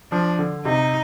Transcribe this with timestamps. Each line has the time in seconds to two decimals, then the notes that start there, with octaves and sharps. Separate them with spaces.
0.12 F3 D4
0.39 D3
0.65 C3 D#4